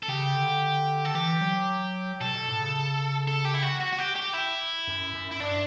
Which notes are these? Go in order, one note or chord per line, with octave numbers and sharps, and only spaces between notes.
A4
C#3 G4
D3
A4
E3 G4
F#3
B2 A4
B2
A2
C#3
A4
G4
E4
F#4
F#4
F#4
G4
G4
E4
F#2
F#2
E4
G2 D4